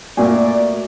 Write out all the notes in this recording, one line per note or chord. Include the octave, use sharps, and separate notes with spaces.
A#2 A3 F#4 D5 E5 G#5